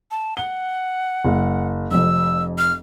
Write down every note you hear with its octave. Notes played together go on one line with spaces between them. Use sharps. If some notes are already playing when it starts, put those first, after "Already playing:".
A5
F#5 G7
F#1
F1 F2 E6
F6